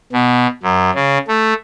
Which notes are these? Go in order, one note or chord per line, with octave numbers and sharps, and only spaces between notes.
B2
F#2
C#3
A3